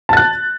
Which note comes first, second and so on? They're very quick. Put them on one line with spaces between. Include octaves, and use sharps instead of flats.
A5 A6 F#6